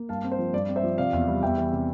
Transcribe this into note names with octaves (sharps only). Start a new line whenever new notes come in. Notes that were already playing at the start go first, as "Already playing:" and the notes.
Already playing: A#3
G2 F5 A5
C4
C5
F3
G2 D5
C4
C5 E5
F3
C3 D5 F5
E2
G3
E2 E5 G5
E3
C3